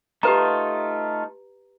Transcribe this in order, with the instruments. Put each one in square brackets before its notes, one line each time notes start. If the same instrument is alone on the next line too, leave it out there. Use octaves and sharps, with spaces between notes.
[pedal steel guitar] A3 D#4 F4 [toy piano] G4 B4 A#5